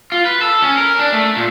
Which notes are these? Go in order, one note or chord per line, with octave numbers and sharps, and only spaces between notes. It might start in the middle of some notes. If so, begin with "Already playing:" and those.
F4
B4
A4
C#4
A#4
D4
A3
A#2